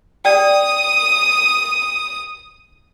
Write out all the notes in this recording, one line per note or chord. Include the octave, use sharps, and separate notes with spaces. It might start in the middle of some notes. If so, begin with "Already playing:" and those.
D5 G5 D#6